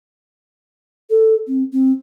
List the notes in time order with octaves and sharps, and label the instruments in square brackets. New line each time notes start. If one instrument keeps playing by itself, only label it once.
[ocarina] A4
C4
C4